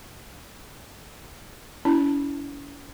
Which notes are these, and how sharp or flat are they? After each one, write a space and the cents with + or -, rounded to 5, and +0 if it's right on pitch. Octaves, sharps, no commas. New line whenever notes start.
C#4 +40 E4 +0